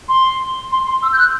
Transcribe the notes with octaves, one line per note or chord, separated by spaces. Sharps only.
C6
C6
C6
E6
G6
F#6